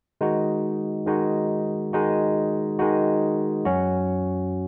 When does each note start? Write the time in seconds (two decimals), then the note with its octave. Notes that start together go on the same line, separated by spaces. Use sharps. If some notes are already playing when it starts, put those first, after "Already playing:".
0.21 D#3 G#3 D#4 F#4
1.06 D#3 G#3 D#4 F#4
1.93 D#3 G#3 D#4 F#4
2.79 D#3 G#3 D#4 F#4
3.65 F#2 F#3 C#4 F#4